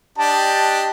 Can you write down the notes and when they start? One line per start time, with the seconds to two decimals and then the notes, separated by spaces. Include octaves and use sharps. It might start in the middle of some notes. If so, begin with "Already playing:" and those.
0.18 D4 G4 D#5 A5